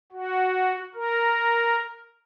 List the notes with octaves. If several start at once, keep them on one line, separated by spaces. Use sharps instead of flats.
F#4
A#4